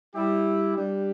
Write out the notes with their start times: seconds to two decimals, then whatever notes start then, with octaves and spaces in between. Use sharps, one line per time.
0.15 G3 E4 G4
0.76 G3 D4 G4